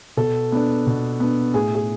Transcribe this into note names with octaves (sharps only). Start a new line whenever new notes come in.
B2 A4
B3 D4
B2
B3 D4
A2 G#4
G#4